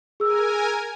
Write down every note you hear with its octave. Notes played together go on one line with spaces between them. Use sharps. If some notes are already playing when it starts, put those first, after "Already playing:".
G#4 A#4 G#5 E6